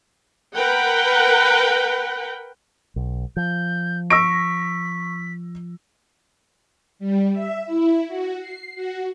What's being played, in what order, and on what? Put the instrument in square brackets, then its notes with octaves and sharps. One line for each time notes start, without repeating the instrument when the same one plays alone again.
[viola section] A#4 B4 F#5 G5
[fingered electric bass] B1
[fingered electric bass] F3 [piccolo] G6
[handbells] C#6 [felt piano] E6 A#6 D7 [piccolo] B6
[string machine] G3
E5
E4
F#4
C7
F#4